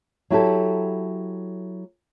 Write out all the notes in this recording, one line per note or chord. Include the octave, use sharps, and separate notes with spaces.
F#3 E4 G4 A4